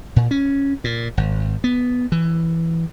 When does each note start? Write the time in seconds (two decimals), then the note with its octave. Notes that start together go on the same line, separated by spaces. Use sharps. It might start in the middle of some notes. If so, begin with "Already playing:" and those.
0.16 A#2
0.31 C#4
0.84 A#2
1.17 G#1
1.64 B3
2.12 E3